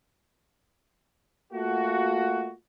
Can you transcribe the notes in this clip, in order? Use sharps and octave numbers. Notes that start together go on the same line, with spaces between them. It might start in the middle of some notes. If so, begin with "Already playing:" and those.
A3 A#3 F4 F#4